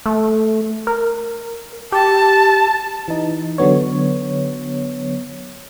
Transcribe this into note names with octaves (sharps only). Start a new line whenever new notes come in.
A3
A#4
G4 A5
E3 D#4
D3 F#3 B3 C#5